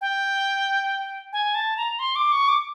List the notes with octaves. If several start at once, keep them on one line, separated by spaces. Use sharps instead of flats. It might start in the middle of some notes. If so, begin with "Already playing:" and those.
G5
G#5
A5
A#5
C6
D6
C#6
D6